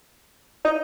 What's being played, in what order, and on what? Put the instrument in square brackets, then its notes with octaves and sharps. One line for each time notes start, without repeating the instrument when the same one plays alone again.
[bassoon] D#4